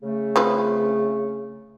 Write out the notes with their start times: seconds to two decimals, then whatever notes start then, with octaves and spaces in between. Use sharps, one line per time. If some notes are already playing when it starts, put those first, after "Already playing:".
0.02 C#3 A3
0.36 C4 F4 B4